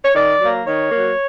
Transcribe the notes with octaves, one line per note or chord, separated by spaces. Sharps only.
C#5
D#3 D5
F#3 A#3
D#3 C#5
F#3 A#3